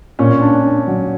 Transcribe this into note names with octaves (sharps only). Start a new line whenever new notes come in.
A#2 C#4
D4
D4
F#3